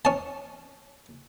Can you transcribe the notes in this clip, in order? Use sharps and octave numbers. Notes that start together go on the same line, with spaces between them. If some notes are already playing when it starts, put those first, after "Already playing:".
C#4 A5